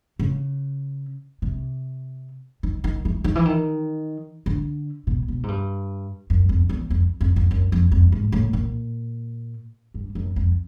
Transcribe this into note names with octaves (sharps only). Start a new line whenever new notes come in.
C#3
C3
D#3
D#3
E3
D#3
E3
D#3
D3
B2
B2
G#2
G2
F#2
F2
E2
F2
F2
F2
F#2
F2
F2
G#2
A2
A#2
G2
F#2
F2